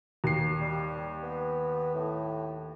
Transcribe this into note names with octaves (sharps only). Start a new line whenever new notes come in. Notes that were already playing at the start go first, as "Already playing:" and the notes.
D#2 C7
G3
B3
A2